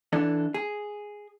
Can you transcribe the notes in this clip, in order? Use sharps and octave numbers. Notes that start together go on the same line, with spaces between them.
E3 D4 A4
G#4